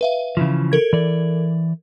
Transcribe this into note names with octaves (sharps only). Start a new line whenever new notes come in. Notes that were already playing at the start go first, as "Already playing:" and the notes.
B4 E5 F5
C#3 E3 F3
A4 A#4 G#6
E3 D5